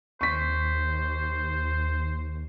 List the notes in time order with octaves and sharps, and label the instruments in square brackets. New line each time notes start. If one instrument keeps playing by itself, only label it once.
[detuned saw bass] D#2 [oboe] C5 [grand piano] C#6 B6